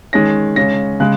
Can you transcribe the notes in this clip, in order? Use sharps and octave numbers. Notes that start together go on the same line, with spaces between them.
D#3 G#3 C#4 A#6
C#3 G#3 C#4 A#6
C#3 G#3 F#6